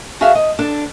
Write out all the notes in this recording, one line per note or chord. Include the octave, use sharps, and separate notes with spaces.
F#4 G#4 A4 E5 F5
D#5
D4 A4